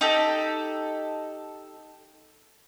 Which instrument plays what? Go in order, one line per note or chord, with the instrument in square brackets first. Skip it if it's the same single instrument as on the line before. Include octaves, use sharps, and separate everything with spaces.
[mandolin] D#4 G4 A4